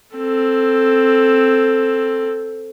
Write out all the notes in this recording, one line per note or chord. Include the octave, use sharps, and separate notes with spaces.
C4 A4